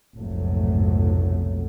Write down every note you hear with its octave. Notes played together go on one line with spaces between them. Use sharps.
F1 B1 G#2 F#3 A3